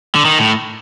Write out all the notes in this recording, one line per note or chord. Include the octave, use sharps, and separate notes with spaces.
D3
D#3
A2